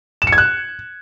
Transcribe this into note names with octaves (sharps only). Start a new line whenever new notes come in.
E7
C#7
G#6
F#6